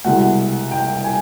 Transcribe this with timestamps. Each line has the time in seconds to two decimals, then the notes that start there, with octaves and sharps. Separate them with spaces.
0.04 C2 B2 G#3 F#5
0.71 G5
1.04 G#5